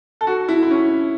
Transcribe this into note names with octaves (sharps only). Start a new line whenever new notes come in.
A4
F#4
E4
E4
C#4